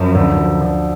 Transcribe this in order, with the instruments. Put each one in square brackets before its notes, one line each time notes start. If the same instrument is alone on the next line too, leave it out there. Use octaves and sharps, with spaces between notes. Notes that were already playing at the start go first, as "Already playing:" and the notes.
Already playing: [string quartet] F#2 [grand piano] F3
[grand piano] D2
F3
D2